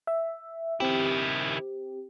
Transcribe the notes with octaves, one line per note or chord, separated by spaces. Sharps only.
E5
D#3 C4 E4 G4